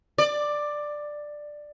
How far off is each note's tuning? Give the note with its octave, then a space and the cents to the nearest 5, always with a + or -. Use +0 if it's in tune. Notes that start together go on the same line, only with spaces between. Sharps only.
D5 +10